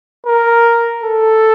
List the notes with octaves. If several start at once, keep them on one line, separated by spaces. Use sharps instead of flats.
A#4
A4